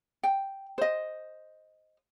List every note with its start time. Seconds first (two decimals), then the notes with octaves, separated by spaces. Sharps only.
0.23 G5
0.78 C5 D#5